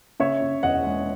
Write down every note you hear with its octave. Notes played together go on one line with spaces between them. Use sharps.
C#3 C#5 E5
C#3
E1 D#5 F#5
G#3